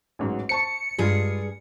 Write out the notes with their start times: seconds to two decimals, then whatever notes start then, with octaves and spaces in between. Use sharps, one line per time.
0.19 A1 G#2 F#3
0.49 C5 A5 C#6 C#7
0.98 G2 G3 G#3 F4 G#4